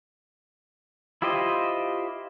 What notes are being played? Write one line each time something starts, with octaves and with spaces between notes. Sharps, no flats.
E4 F4 G4 C5 D#5